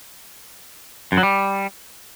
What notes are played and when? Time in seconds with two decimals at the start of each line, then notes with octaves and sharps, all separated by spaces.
1.12 F#2
1.18 F#3
1.23 G3